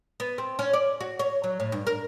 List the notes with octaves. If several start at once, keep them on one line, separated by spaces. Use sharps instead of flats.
B3
C4
C#4
D5
F#4
C#5
F#3
A2
G2
A#4